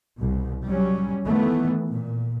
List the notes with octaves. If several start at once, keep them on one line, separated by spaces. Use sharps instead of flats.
C2 B2
F#3 G3 C#4
D#3 E3 A3 B3
A#2